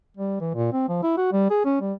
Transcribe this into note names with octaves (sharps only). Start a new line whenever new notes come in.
G3
E3
A#2
C4
F3
E4
F#4
G3
G#4
C#4
G3